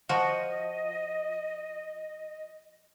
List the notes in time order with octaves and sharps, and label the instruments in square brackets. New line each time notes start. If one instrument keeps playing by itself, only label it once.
[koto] F3 F#4 [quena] D#5